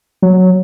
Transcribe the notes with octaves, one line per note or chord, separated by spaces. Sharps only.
F#3